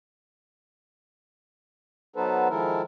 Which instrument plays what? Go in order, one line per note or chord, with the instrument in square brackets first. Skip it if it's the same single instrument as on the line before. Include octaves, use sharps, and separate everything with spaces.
[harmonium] F#3 B3 D#4 A4 B4 C5
D#3 F3 G#3 E4 A4 A#4